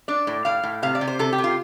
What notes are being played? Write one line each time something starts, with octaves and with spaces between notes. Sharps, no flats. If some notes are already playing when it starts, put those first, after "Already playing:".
D4 D5
A2
A2 F5
A2
C3 F5
D5
C3
C5
C3 A4
G4
C3
F4